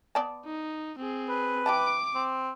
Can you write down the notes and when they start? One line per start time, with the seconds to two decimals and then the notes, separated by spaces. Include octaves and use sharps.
0.15 B3 D5 A5
0.46 D#4
0.99 C4 G#4
1.29 B4
1.66 E3 G4 A5 D6 D7
2.15 C4